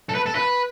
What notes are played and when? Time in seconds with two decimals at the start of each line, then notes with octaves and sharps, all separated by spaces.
0.09 A4
0.15 B4
0.26 A4
0.35 B4